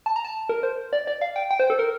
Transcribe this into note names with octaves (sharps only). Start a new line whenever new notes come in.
A5
A#5
A5
A#4
C5
D5
D5
F5
G5
G5
C5
A4
A#4